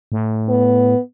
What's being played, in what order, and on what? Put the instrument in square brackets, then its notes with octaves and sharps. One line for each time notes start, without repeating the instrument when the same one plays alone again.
[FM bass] A2
[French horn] B3